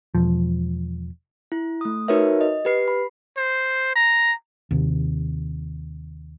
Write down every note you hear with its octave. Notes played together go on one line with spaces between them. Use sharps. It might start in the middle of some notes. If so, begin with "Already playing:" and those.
E1 F3
E4
A3 D#6
D#4 F#4 A#4 B4 C#5 E5
D#5
G4 B4 C7
B5
C5
A#5
D#2 C3